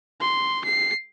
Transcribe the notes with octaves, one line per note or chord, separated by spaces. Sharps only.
C6
C7